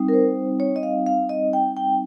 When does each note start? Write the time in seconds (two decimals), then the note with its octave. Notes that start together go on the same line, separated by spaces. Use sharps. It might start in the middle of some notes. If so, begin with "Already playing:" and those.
Already playing: G3 C4 D#4
0.08 A#4
0.13 C5
0.60 C#5
0.76 D#5
0.83 F5
1.06 F5
1.29 D#5
1.53 G5
1.77 G5